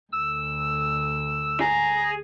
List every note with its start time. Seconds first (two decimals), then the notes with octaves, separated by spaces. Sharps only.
0.12 D2 E6
1.60 G#4 A#5